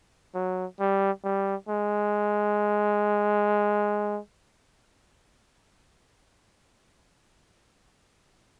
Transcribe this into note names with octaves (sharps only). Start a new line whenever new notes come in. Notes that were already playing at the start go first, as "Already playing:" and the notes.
F#3
G3
G3
G#3